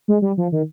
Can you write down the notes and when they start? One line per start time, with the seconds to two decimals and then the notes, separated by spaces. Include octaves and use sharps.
0.08 G#3
0.22 G3
0.37 F3
0.52 D#3